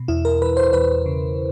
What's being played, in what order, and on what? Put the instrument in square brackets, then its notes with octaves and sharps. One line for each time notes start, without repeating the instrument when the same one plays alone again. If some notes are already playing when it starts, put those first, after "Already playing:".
Already playing: [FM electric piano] B2
E2 E4
A#4
E3 B4
C5
E2 B4
C#3